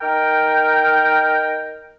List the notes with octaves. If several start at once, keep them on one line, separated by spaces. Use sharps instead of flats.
D#4 A#4 G5